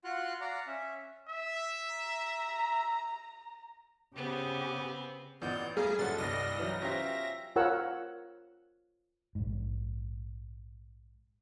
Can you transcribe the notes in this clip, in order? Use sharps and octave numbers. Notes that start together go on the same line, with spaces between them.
F4 F#4 F5 F#5 C6 F#6
D5 F5 F#5 A#5
C#4 E5
E5
A#5
C#3 B3 C4 G4
A1 A#2 D#3 B3 D5 G6
G3 A3 G#4 F5 A#5
F#2 A#2 G3 B3 F#4 A4 A6
C2 G2 D5 D#5 A#6
E3 F#3 D#4
C#4 F4 G4 C5 E5
F4 A#4 C#5 F#5 E6
A#1 G#2